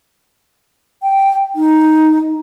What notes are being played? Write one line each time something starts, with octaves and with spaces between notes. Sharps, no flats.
G5
D#4